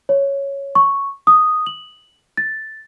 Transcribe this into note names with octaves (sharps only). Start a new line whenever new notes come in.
C#5
C#6
D#6
F#7
A6